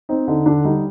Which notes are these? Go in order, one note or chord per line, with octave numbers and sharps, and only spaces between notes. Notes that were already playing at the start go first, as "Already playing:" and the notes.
C4 D#4
D3 D#4
D3 D4
G3 D#4